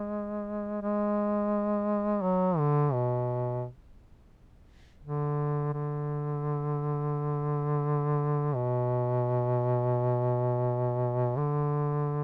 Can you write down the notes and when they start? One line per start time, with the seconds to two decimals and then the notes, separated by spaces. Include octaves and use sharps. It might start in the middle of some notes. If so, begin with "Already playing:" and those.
Already playing: G#3
0.82 G#3
2.22 F#3
2.58 D3
2.93 B2
5.04 D3
5.74 D3
8.55 B2
11.37 D3